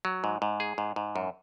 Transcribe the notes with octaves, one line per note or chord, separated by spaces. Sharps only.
F#3
G#2
G#2
G#4
G#2
G#2
F#2